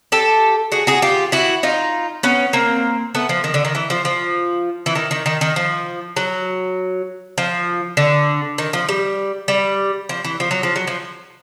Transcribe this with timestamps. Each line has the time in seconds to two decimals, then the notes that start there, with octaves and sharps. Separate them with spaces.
0.12 G4 A4
0.72 F#4 G#4
0.87 F#4 G#4
1.02 F4 G4
1.32 E4 F#4
1.63 D#4 F4
2.23 B3 C#4
2.53 A#3 C4
3.15 A3 B3
3.29 F3
3.44 D#3
3.54 D3
3.65 D#3
3.75 E3
3.90 F3
4.05 F3
4.86 E3
4.95 D#3
5.11 D#3
5.26 D#3
5.41 D#3
5.56 F3
6.16 F#3
7.38 F3
7.97 D3
8.58 D#3
8.73 F3
8.89 G3
9.48 G3
10.09 F3
10.24 E3
10.40 F3
10.51 F#3
10.63 F3
10.76 F#3
10.87 F3